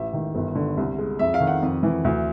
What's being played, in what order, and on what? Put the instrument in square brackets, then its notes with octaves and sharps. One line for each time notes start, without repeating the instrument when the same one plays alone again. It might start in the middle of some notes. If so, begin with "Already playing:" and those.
Already playing: [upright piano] A1 E5
D#3
G1
D3
C2
G#3
F2 E5
F5
D#3
F#5
F2
E3
D2